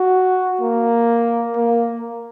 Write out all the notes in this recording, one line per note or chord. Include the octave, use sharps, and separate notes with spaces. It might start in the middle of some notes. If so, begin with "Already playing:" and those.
Already playing: F#4
A#3
A#3